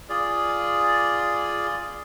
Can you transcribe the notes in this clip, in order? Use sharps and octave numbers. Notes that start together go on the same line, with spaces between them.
F4 G#4 D5